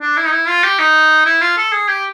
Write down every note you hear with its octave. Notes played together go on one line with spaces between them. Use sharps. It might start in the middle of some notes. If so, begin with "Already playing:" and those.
D4
E4
D#4
E4
F4
G4
D#4
E4
F4
A4
G#4
G4